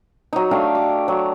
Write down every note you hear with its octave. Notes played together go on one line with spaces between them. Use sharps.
F#3 D#4
A3 D4 G4 F5
D6
F#3